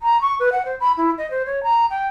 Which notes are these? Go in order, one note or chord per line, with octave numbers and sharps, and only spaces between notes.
A#5
C#6
B4
F#5
C5
B5
E4
D#5
C5
C#5
A#5
G5